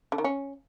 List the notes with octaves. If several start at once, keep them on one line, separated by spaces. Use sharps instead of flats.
D3
D#3
C#4